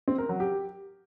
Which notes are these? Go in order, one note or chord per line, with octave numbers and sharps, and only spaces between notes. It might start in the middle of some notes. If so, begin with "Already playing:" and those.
C4
A#4
F#3
G4